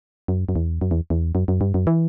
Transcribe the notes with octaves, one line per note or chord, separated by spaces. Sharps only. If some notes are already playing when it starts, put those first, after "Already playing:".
F#2
F#2
E2
F#2
E2
E2
F#2
F#2
G2
F#2
E3